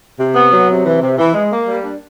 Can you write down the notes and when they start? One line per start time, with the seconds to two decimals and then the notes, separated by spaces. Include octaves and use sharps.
0.19 C3
0.34 B3
0.52 F#3
0.68 C3
0.85 E3
1.01 C3
1.18 E3
1.34 G#3
1.51 A#3
1.67 G3
1.84 D4